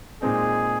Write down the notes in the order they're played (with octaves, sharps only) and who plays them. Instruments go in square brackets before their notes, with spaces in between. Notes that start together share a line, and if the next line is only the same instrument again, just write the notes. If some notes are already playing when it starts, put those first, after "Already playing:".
[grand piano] A#2 G#3 C4 D#4 [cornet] G#4